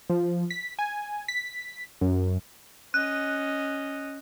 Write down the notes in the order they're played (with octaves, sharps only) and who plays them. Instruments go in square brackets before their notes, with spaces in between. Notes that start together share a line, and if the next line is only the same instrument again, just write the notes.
[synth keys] F3
B6
G#5
B6
F#2
[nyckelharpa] C#4 D#5 [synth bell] F#6